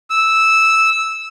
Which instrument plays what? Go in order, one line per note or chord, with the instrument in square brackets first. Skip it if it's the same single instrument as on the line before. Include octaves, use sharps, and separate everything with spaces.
[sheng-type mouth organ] E6